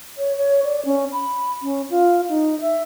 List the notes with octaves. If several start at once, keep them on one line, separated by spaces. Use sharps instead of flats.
C#5
C#5
D5
C#4
B5
C#4
F4
D#4
E5